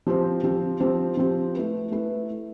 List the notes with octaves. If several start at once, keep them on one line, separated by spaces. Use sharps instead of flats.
F3 C4 G4 C5
F3 C4 G4 C5
F3 C4 G4 C5
F3 C4 G4 C5
A3 E4 B4
A3 E4 B4